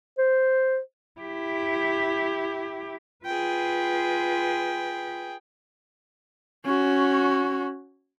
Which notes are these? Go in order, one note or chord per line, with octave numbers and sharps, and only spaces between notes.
C5
E4 G4
F4 G#4 B4 G5
C#4 F#4